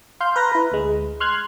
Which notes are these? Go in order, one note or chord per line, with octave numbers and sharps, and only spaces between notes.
F5 C6 F6 G6
B4 A#5 A#6
E4 B4
D2 G#3
C6 F6 F#6 G#6